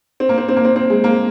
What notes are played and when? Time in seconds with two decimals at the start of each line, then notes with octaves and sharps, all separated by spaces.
0.20 C4
0.29 A#3
0.38 C4
0.48 C4
0.56 A#3
0.65 C4
0.76 C4
0.90 G#3
1.04 A#3